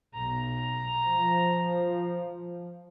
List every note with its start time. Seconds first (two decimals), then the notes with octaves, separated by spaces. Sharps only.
0.14 B1 A#5
1.07 F3